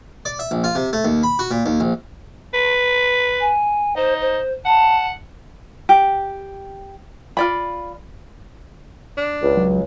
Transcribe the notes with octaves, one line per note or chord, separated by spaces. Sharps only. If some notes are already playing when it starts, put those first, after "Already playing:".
D5
E5
A#1
F4
C3
A3
D#2
B5
F#4
A#2
D#2
A#1
B4
G#5
D#4 C5
C5
F#5 A5
G4
F4 D5 B5
D4
C#2
F#3